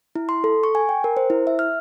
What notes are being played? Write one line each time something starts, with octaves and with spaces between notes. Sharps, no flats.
E4
C6
A4
C#6
G#5
G5
A#4
C5
E4
E5
F6